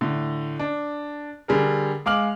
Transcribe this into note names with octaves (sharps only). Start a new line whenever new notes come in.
A2 D3
D4
D3 G3 G#4 A#4
G#3 F5 D6 F6 F#7